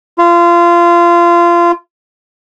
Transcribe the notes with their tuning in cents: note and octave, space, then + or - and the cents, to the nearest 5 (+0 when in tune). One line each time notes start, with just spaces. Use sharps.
F4 -25